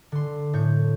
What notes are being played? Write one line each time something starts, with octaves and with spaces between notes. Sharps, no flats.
D3 C6
A2 C#5 G6